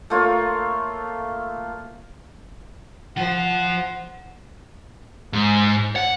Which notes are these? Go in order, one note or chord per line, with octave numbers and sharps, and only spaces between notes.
A3 A#3 F4 C#5
F3 C5 F#5
G#2
F#5